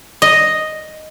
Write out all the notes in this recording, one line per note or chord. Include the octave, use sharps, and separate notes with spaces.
D#5